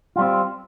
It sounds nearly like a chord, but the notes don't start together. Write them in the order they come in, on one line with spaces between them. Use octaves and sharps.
F4 G3 C4